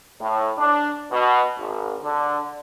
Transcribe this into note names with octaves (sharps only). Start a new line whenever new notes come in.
A2
D4
B2
G#1
D3